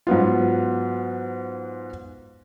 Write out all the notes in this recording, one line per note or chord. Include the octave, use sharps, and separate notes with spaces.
G#2 F#3 B3 F4